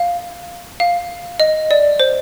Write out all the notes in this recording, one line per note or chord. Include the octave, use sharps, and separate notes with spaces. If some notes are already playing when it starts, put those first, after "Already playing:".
Already playing: F5
F5
D#5
D5
C5